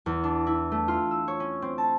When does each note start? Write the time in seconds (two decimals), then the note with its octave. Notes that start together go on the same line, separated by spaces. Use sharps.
0.06 E2
0.24 D4
0.47 E4
0.72 A3
0.88 F4
1.11 E6
1.28 C#5
1.40 C#4
1.62 C4
1.78 A5